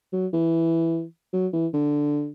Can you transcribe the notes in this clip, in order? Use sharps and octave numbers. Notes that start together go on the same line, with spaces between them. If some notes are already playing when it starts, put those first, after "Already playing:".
F#3
E3
F#3
E3
D3